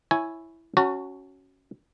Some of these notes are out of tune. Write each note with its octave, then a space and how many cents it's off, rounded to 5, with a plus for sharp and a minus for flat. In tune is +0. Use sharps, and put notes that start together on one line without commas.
E4 +0 C#5 +0 G#5 +0
C#4 +0 F#4 +10 A5 +40